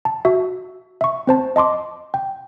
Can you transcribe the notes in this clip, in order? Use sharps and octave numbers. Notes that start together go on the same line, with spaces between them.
A5
F#4 E5
E5 C#6
C4 C5 A5
D#5 A5 C6 D6
G5